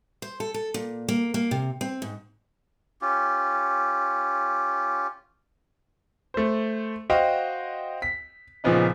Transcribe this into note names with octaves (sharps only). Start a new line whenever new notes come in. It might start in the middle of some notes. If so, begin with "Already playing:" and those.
C5
A4
A4
A#2
A#3
A#3
C3
C4
G#2
C#4 F4 G4
A3 C5
F#4 C5 D#5 F5 G5
B6
A#2 C#3 F3 B3 D#4